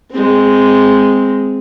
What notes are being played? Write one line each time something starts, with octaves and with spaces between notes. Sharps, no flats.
G#3 C4